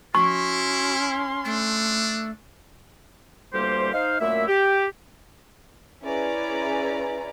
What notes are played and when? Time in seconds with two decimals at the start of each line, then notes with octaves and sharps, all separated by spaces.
0.15 C#4 E4 F#4 C6 C#6
1.45 A3 D4
3.53 D2 E3 G3 A#3 G4 C5
3.93 D#4 C5 F5
4.20 F#2 A#2 A3 A#3 E4 E5
4.48 G4
6.03 C#4 E4 G#4 B4 D5 A#5